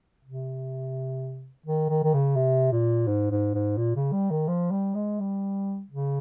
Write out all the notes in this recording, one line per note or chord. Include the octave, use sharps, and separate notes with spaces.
C3
D#3
D#3
D#3
C#3
C3
A#2
G#2
G#2
G#2
A#2
C#3
G3
D#3
F3
G3
G#3
G3
C#3